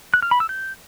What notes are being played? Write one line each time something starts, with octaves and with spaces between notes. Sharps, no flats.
F#6
F6
B5
E6
G6